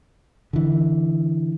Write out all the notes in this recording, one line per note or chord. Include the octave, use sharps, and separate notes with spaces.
D3 E3